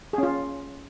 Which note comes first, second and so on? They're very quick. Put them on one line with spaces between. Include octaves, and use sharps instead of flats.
G#4 C#4 F4